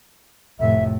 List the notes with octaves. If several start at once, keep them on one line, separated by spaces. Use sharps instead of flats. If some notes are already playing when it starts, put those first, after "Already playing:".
F1 A2 E5